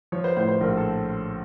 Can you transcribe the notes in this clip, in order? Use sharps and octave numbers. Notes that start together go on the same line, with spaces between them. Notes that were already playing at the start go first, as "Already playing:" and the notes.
F3 C#5
C5
A2 C5
C5
A#1 A#4
A4